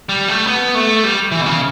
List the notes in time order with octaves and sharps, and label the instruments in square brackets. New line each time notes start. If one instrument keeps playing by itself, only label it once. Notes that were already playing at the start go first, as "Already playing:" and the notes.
[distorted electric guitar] G3
A3
B3
A3
G3
E3
B2
C#3